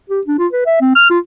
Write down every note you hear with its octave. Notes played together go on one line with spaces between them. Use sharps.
G4
D4
F4
B4
E5
C4
F6
F4